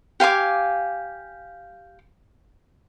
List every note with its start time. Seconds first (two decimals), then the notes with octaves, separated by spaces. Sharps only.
0.20 G4 F5 G#5 D6